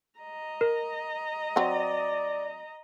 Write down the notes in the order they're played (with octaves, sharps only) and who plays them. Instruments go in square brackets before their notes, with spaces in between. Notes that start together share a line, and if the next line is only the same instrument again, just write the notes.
[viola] D#5 A#5
[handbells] A#4
[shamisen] F#3 C4 [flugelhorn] D5 [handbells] F#5